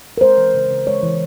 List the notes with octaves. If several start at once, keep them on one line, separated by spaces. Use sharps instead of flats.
A#4
G#3 C5
E3
C#3
C#3
G#3 C#5
E3